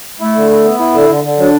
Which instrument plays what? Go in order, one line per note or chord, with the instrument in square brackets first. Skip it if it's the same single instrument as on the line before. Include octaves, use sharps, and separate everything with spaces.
[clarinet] A3 [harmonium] E4
[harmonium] D3
E4
B3
E4
D3
D3
D3
[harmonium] F#3 [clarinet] D4